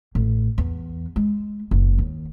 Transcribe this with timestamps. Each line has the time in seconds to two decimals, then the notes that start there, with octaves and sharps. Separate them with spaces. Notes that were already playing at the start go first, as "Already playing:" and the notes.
0.15 A1
0.58 E2
1.16 G#3
1.71 F#1
1.98 D#2